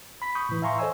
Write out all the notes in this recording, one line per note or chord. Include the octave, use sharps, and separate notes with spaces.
B5 B6
B5 C#6 D#6 G6
A2 E3
E5 F5 G#5 A#5 C6 C#6
A4 C5 C#5 D#5 G#5 E6